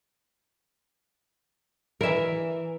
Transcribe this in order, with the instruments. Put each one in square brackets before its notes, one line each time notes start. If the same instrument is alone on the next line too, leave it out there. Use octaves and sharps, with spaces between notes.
[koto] E3 E4 [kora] A#4 E5